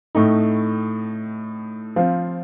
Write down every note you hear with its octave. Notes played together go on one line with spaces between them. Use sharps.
A2 A3 D#4
F3 C4 F4 C5